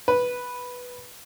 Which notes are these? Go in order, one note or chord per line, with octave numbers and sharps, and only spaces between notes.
B4